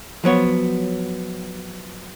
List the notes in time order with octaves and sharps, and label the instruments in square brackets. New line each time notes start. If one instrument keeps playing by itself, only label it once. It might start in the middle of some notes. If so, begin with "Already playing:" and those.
[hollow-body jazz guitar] F3 F#3 B3 C#5